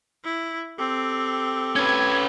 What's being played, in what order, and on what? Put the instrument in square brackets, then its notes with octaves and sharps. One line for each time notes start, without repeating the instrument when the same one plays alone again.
[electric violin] E4
[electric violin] C4 [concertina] G4 A4
[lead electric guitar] C#4 B4 [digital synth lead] G#6